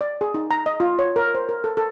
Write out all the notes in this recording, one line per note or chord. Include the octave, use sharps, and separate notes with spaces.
D5
G#4
D#4
A#5
D#5
F4
C#5
A#4
C5
A#4
A4
A4